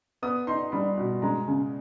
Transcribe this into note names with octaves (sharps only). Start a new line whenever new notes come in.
B3 D#6
D#4 C6
G3 B5
B2
G#3 A#5
C#3